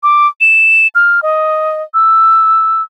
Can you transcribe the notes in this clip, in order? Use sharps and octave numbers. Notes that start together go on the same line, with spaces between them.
D6
E7
F6
D#5
E6